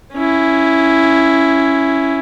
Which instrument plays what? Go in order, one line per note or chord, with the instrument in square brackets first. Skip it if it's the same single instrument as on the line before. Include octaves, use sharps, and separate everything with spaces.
[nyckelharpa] C#4 E4